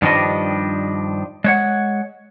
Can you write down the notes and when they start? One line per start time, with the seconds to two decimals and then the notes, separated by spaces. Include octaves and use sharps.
0.02 G2 D#3 F3 G3 D4 D#5
1.44 G#3 C#5 F#5